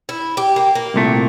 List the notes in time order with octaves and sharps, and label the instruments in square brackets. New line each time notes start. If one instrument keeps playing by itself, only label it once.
[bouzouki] E4
G4
A#3
A#3
[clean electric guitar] C2 A#2 A3